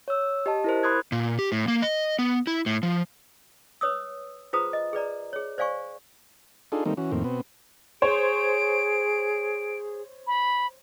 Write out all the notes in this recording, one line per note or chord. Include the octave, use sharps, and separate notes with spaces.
C#5 E6
G4 D#5 A5
E4 A#4 C5
B5 C6 D#6 F#6 G#6
A#2
G4
A2
A#3
D#5
B3
E4
A2
F3
B4 C#5 D#6 E6
F4 G#4 B4 C5 A#5 D#6
D#5
G#4 B4 D5 A#5
G#4 C#5
C5 D5 F5 G#5 C#6
D4 D#4 F4 G#4 A4
D#3 G3 A3 A#3 C4 D#4
E3 C#4 F#4
F2 A2 D#3 A#3 C4
B2 B3 C4
G#4 C5 C#5 D7
B5